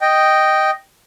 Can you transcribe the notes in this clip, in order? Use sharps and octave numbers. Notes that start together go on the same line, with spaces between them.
D#5 G5